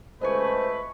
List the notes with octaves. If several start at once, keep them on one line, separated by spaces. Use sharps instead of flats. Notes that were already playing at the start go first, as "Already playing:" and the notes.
C#2 A3 B4 C5 D#5 G#5 C#6